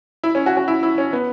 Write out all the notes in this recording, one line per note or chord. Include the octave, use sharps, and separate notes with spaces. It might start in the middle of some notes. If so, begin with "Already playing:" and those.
E4
C#4
F#4
F#4
E4
E4
C#4
B3